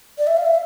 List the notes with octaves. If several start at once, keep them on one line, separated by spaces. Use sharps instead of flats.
D5
E5
F5
E5